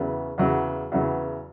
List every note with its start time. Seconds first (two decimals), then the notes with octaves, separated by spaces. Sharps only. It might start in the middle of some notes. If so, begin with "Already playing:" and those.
Already playing: E2 C#3 F#3 B3
0.38 E2 C#3 F#3 B3
0.92 E2 C#3 F#3 B3